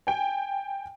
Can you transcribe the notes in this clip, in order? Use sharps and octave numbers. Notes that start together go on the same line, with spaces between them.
G5 G#5